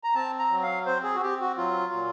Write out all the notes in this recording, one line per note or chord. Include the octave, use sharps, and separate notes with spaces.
A#5
C4 A5
A#5
F#3
F5
C4 C5
G#4
F#4
C4 G4
F#4
F#3 F4
A#2